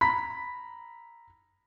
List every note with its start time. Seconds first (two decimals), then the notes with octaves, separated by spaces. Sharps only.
0.01 A#5 B5 B6